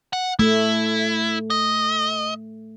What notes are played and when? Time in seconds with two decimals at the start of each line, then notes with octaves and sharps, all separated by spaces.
0.13 F#5
0.39 A3 E4
1.50 D#5